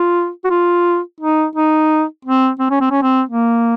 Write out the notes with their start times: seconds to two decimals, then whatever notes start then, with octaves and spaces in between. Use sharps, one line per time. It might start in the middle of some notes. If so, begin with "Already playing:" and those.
Already playing: F4
0.45 F#4
0.50 F4
1.20 D#4
1.55 D#4
2.25 C4
2.59 C4
2.70 C#4
2.81 C4
2.91 C#4
3.02 C4
3.29 A#3